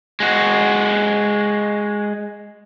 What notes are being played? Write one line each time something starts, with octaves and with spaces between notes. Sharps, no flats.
G#3 F#4